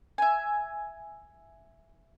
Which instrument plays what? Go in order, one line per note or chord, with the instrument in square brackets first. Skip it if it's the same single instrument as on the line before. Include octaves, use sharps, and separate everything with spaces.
[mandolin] E5 G#5